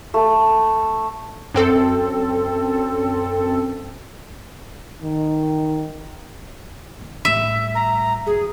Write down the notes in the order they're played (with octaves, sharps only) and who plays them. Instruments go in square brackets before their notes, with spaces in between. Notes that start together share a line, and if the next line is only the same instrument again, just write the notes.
[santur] A3
[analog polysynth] F#2 C4 A4
[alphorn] D#3
[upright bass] D#3
[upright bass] A2 G3 [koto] E5
[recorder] A#5
[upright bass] F#2 F3 [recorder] G#4